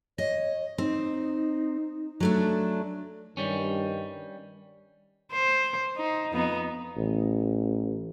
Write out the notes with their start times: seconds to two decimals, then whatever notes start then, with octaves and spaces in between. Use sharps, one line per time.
0.18 C#5 D#5
0.78 C4 D#4
2.20 F#3 A3 D4
3.37 G2 D#3 G3 C#4
5.32 C5
5.96 D#4
6.32 F2 B3 D#4
6.97 A1